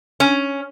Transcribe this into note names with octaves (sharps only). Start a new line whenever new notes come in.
C#4